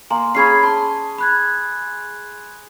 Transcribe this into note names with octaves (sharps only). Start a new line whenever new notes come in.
A#3 G#5 A#5 C6
C#4 G#4 B5 G#6 C7
A5 C6
B5 F#6 G#6